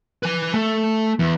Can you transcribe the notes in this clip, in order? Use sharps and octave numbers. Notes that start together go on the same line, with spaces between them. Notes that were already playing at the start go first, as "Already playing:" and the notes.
B4 G#5
A3
E2